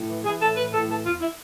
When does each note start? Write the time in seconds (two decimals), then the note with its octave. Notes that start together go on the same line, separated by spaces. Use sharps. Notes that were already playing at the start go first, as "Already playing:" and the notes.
Already playing: A2
0.09 E3
0.24 E3 G#4
0.41 A2 A4
0.56 E3 B4
0.72 A2 A4
0.89 E3 A4
1.04 E2 F4
1.21 E4